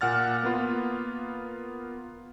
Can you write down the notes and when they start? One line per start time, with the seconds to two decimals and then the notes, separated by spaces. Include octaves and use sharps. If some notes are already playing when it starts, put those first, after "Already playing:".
0.01 A#2 F#5 F6 A6
0.43 A#3 B3 F4